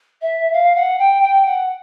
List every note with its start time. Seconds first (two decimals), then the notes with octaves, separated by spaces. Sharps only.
0.21 E5
0.53 F5
0.75 F#5
0.99 G5
1.22 G5
1.45 F#5